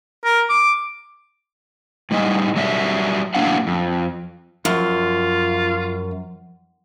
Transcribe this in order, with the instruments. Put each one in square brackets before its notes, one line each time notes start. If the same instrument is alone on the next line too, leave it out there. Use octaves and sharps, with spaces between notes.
[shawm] A#4
D6
[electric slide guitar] A2 G3 D#4 D#5
F#3 G3 D5 E5
A2 F#3 A#3 D4 F5 F#5
F2
[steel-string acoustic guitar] F#2 [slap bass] F3 [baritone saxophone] F4